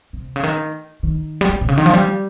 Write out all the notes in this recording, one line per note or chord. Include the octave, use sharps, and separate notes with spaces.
C3
C#3
D#3
D#3
G3
F3
C3
C#3
D#3
F3
G3